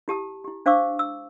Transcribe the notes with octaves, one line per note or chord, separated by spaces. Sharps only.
E4 G4 A5 D#6
E4 G4
D4 C5 F5 C#6 D6 E6
E6